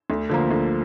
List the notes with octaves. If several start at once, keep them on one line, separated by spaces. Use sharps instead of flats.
D2
D3 F3 A#3
D2